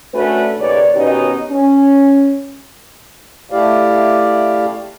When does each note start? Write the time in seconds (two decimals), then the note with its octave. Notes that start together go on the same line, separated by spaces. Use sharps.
0.14 A3 C#4 D4 F#4 B4
0.59 D#2 C#3 B4 C#5 D5
0.94 B2 D#3 B3 C#4 D#4 G4
1.51 C#4
3.51 A3 E4 G4 D5 F5